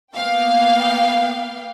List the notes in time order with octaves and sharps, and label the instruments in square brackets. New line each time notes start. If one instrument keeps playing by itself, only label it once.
[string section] A#3 B3 F5 G5